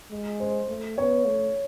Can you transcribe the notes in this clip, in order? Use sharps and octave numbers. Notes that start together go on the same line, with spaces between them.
G#3
C5
A3
B3 C#5
A3